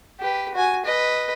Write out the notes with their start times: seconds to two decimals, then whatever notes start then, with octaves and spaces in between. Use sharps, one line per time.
0.20 G4 B4
0.54 F#4 G#5
0.85 B4 D#5